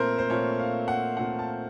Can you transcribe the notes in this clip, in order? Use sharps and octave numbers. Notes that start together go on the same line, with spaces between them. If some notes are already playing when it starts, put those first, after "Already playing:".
Already playing: A#2 A3 C4 A4 A#4 C5
C5
A#2 A3 C4 C#5
F5
F#5
A#2 A3 C4 F#5
A5